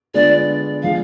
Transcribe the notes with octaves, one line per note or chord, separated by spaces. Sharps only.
D3 G#3 B3 F4 D5
F3 G#3 F5